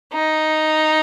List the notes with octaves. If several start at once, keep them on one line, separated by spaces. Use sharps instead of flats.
D#4